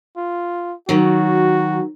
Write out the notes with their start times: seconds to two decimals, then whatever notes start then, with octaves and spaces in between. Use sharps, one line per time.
0.17 F4
0.89 D#3 F#3 F#4